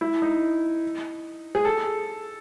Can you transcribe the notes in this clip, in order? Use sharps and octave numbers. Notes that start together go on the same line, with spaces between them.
E4
D#4
G#4
A4